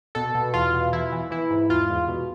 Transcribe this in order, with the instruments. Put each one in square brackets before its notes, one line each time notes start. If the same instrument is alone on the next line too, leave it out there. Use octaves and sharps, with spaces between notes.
[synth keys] B2 A4
B2
E2 F4
B2
E3 E4
E3
E3 E4
G#2
E2 F4
E2
B2